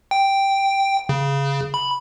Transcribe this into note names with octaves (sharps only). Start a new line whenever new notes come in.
G5
C#3
B5